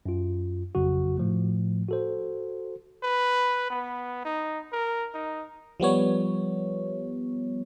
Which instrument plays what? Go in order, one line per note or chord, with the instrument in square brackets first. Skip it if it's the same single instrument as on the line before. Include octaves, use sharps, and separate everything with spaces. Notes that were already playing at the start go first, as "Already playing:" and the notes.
[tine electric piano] F#2 F4
G#1 F2 C#3 F#3 F#4
A2 F3 A3
F#4 A4 C5
[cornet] B4
B3
D#4
A#4
D#4
[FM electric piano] F3 G3 B3 C#5